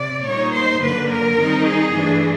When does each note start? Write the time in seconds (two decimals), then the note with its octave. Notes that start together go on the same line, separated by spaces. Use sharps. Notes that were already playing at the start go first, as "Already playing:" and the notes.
Already playing: C3 D5
0.25 A#2 G3 A#3 D#4 C#5
0.53 C5
0.81 F#2 D3 F#3 A#3 B4
1.10 A#4
1.38 D#3 G3 C4 D#4
1.66 G#4
1.94 G2 E3 A3 D4